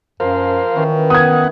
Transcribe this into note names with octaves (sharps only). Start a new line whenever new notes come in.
F#2 F3 A#4 C5 F5
D#3 E3 C#4 E4
B3 F#5 D#6 G#6